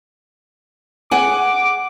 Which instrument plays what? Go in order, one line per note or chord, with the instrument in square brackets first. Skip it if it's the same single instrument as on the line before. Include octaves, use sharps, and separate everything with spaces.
[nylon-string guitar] G#4 F#5 G#5 [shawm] D6